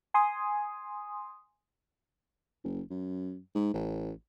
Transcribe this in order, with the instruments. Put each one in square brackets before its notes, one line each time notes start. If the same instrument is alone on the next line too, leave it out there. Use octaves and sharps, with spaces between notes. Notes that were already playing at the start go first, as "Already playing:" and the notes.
[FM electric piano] G#5 C6 D#6
[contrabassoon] F#1
F#2
G#2
A1